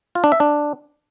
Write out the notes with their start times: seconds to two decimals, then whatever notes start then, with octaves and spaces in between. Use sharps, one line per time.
0.15 F4
0.24 D4
0.32 E5
0.40 D4